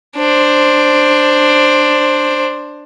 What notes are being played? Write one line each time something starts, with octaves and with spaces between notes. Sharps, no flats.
D4 C5